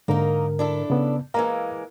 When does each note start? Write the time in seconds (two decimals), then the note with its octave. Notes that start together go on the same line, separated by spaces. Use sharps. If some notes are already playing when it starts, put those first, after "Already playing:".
0.08 G#2 D3 A#3 D#4 A#4
0.59 D4 E4 A4
0.90 C#3 B3
1.34 E3 G#3 A#3 F5 A#5